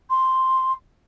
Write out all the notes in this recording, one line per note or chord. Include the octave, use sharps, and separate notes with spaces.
C6